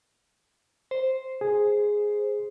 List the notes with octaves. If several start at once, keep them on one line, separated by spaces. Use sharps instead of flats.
C5
G#4